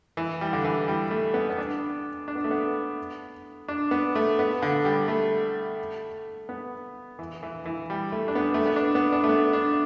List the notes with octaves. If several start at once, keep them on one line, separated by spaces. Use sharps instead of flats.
E3
G3
D3
E3
G3
A3
B3
B3
D4
D4
B3
A3
B3
D4
B3
A3
B3
D3
G3
A3
B3
E3
E3
E3
G3
A3
D4
B3
A3
B3
D4
B3
D4
A3
B3
D4